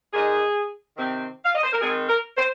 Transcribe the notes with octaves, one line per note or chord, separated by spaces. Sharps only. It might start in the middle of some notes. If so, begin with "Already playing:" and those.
A#2 G#3 D#4 G#4
C3 D#3 C4
F5
D#5
C5
A#4
D#3 G#3 C4 G#4
A#4
C5